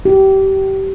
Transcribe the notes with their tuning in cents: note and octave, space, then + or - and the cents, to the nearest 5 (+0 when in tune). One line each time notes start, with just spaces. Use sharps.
G4 -25